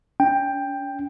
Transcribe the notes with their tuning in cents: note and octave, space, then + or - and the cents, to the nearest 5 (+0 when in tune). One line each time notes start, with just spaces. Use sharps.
C#4 +45 G5 +10